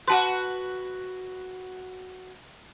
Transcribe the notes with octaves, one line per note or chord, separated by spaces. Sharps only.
F#4 B4 F#5 A5 C6